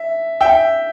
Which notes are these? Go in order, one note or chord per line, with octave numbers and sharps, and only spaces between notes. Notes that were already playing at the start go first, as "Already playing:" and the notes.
Already playing: E5
E5 G5